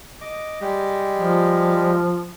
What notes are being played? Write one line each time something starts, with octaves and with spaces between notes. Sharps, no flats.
D#5 D6
G3 G#3 G4
F3